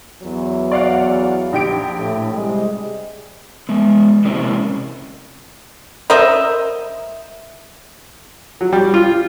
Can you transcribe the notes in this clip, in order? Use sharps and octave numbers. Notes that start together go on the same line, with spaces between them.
E2 F#3
D5 F5 F#5
A#1 G4 D7
A2
C3 G3 G#3
G#3 B3
C3 G#3 A#3 C4 C#4 E4
A#4 C5 D#5 E5
F#3
G3
F4